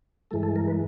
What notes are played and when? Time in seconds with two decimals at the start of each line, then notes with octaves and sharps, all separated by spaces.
0.31 G2 E3 G#3 A4
0.43 A4
0.56 A#4
0.68 B4